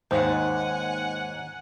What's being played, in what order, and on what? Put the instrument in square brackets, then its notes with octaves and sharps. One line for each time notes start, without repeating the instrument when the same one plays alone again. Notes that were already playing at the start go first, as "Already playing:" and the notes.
[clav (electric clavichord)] D#2 [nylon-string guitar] G#2 [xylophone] C5 [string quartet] F#5 G#5